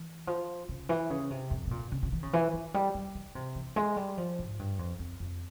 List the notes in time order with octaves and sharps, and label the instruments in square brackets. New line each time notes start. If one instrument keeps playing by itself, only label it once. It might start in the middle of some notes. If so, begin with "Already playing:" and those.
Already playing: [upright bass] E3
F3
C#3
E3
C#3
C3
F2
C3
A#2
C#3
C#3
E3
C#3
E3
E3
G3
G3
E3
C3
E3
G#3
G3
F3
G#2
G2
F2
F2
F2